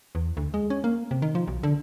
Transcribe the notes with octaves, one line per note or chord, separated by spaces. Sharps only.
E2
D2
G#3
C#4
A#3
C3
D#3
F3
B1
D3